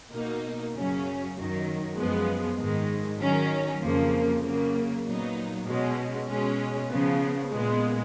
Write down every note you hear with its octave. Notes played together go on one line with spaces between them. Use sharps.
B2 A#3 D#4
F#2 C#3 F#3 C#4
F#2 D#3 F#3
F#2 F3 G#3 B3
G#2 D#3 G#3
D#3 F#3 C#4
F2 C#3 F3 A#3
C#3 F#3 A#3
A#2 F#3 B3 D#4
B2 G#3 C#4
B2 G#3 C#4
C#3 F3 B3
A#2 G#3 B3